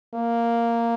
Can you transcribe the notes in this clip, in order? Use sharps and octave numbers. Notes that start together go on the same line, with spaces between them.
A#3